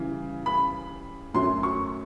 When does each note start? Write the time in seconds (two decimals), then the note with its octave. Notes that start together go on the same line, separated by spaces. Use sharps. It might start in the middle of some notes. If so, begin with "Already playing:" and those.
Already playing: C#3 E3 G3
0.46 B5
1.34 F#2 D3 F#3 A3 C#4 C6
1.63 C#6